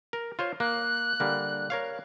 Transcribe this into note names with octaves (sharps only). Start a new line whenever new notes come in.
A#4
F4 C5 C#5
A#3 F#6
D3 G3 A#3
A#4 C#5 F5